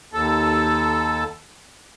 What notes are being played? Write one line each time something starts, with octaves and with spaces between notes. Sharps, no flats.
D#2 A4